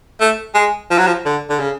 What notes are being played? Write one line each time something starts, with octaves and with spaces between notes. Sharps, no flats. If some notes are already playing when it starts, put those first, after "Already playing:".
A3
G#3
F3
F#3
F3
D3
D3
C#3